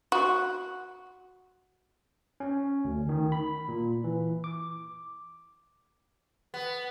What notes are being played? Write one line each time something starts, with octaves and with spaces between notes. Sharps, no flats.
F#4
C#4
D2
D#3
B5
A#2
E3
D6
B3